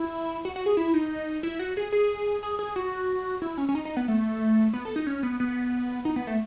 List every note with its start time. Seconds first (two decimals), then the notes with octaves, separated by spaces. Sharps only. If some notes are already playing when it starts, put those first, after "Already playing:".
Already playing: E4
0.45 F#4
0.56 F#4
0.66 G#4
0.77 E4
0.94 D#4
1.43 E4
1.59 F#4
1.77 G#4
1.92 G#4
2.43 G#4
2.59 G#4
2.76 F#4
3.42 E4
3.58 C#4
3.69 C#4
3.75 D#4
3.85 D#4
3.97 B3
4.08 A3
4.74 B3
4.85 A4
4.96 D#4
5.07 C#4
5.23 B3
5.40 B3
6.05 D#4
6.16 B3
6.27 A3